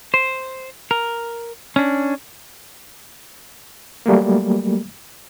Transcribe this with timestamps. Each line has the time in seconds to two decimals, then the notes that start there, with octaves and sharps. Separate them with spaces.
0.14 C5
0.91 A#4
1.76 C#4 D4
4.06 F#3 G3 A3 A#3